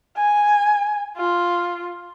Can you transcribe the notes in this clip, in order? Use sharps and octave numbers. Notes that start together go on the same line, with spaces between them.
G#5
F4